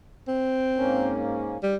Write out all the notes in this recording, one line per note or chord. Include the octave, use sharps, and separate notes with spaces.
C4
G#2 A#3 C#4
G#2 G3